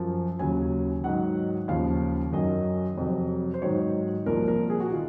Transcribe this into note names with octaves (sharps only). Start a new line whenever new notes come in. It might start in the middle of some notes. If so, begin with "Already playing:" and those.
Already playing: F#2 F3
D#2 C#3 F#3 G#5
G#2 D#3 F#3 F#5
D#2 C#3 F3 F5
F#2 D#3 F#3 D#5
F2 C3 F#3
C5
G#2 D#3 F#3 C#5
C2 A#2 F3 A#4
A#4
G#4
F#4
D#3 F4